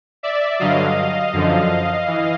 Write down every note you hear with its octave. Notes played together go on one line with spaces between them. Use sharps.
D5 E5
G2 D3 F#3 D#5 F5
F#2 D3 F3
E3